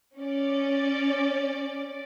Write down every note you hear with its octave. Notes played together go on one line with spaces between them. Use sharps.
C#4 D5